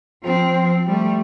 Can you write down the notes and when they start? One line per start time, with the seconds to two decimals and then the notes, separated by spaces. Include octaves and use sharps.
0.23 F3 C4
0.87 G3 A3